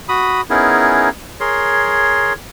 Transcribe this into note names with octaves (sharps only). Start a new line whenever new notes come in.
F#4 B5 D#6
B3 C#4 D#4 E4 G#4 A#4
G#4 A#4 C#5 C6